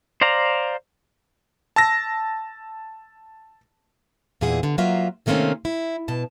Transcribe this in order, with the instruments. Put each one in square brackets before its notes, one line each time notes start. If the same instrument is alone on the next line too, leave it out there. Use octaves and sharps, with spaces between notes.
[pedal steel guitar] C5 D5 F5 A#5
[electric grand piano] A5 E6 A#6
[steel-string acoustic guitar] E2 A#2 E4 G#4 F#5
D3
F#3 A#3 F4 E5
C3 D#3 A3 A#3 C4 C#4
E4
B2 A5